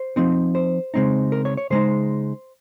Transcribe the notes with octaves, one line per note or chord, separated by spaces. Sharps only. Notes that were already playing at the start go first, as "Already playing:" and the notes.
Already playing: C5
F3 C4 D#4
C5
C#3 G#3 C4 D#4
A#4
C#5
C#5
C#3 G#3 D#4 C5